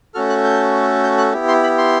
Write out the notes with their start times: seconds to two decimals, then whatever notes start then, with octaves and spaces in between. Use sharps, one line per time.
0.14 A3 C#4 F#4 A4 F6
0.29 F#6
0.44 G6
1.04 G6
1.18 F#6
1.33 B3 E4 G4
1.48 C6
1.63 B5
1.78 C6